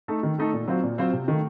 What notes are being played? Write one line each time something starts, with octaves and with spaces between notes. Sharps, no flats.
A3 D#4 A4
D#3
A3 D#4 A4
A#2
F#3 C4 F4 C5
A#2
F#3 C4 F4 C5
C3
D#3 A3